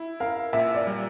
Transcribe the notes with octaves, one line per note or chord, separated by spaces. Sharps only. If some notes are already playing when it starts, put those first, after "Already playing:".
Already playing: E4
A#4 F5
A#2 E5
D5
G3